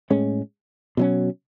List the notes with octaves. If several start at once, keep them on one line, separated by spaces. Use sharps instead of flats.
A2 G#3 C#4
B2 F#3 C#4